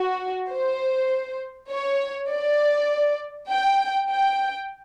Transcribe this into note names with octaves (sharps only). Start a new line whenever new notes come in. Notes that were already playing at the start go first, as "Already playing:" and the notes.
Already playing: F#4
C5
C#5
D5
G5
G5